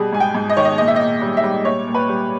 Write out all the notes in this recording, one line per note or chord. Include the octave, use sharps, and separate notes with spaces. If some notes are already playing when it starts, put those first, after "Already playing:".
Already playing: B2 G3 G#4
G#2 G#5
G5
G#2
D#5
D#3 C#5
D#5
A#2 D#5
E5
A#2 D#5
G3
E5
G3
A#2 C#5
A#2
B4
G3